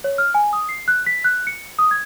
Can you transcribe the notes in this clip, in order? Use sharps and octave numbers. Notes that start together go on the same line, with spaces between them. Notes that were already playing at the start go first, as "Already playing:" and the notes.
C#5
F6
G#5
D#6
C7
F#6
B6
F#6
C#7
D#6
G#6